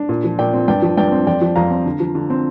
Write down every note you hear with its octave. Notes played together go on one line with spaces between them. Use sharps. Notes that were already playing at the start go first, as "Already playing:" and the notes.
Already playing: D4
A#2
F3
A#2 D5 G5
C4
G2 D5 G5
F3
G2 D5 G5
C4
F2 D5 G5
F3
F2 F5 A#5
C4
D3
F3
D3
C4